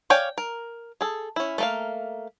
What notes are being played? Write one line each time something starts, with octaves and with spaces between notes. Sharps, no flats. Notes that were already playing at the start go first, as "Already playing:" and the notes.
C#5 D5 F5 G5 G#5
A#4
G#4 A4
C#4 E4
A3 A#3 F5